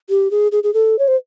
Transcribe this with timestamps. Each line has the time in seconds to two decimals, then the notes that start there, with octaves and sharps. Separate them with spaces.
0.10 G4
0.31 G#4
0.52 G#4
0.64 G#4
0.74 A4
0.99 C#5
1.08 C5